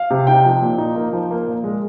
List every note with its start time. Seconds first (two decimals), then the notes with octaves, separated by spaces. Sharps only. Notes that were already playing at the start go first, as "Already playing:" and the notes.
Already playing: F5
0.11 C3
0.27 D#4 G5
0.45 F3
0.61 A#2
0.78 D#4
0.96 A#3
1.13 F3
1.31 A#3
1.47 A#2
1.64 G#3